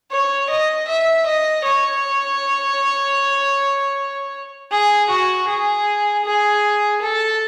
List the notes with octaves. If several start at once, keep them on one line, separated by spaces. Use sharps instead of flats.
C#5
D#5
E5
D#5
C#5
G#4
F#4
G#4
G#4
A4